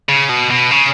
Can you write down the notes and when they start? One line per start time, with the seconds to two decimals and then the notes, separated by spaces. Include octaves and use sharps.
0.09 C#3
0.29 B2
0.50 B2
0.71 C#3